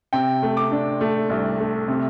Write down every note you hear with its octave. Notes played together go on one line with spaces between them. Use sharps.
C3 G5
A3
D6
D4
A3
C2
A3
C3